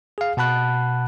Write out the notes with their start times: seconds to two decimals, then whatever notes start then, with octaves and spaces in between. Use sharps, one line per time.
0.18 G#4 F5
0.37 B2 F#5 A5 B5 F#6